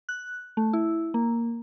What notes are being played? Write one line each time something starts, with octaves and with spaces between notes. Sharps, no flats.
F#6
A3
E4
A#3